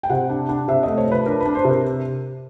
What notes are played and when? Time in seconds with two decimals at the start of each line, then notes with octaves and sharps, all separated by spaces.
0.03 G5
0.10 C3 F#5
0.30 D4
0.49 D4
0.68 C3 E5
0.83 A3 D#5
0.97 C#5
1.07 F3 B4
1.26 D4 A#4
1.40 B4
1.46 D4
1.55 C5
1.65 C3
1.70 A#4